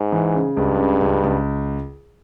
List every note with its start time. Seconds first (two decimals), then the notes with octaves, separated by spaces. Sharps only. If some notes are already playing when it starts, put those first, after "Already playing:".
Already playing: G#2
0.12 E3
0.35 C#3
0.57 C#2 G2
0.79 C#3
1.02 C#2
1.23 C#2